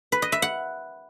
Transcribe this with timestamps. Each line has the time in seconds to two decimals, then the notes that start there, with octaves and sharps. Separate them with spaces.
0.12 B4
0.22 D#5
0.32 E5
0.42 F#5